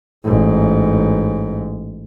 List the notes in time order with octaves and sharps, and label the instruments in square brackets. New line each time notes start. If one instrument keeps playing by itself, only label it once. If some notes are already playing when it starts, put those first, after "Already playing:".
[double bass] A1 G#2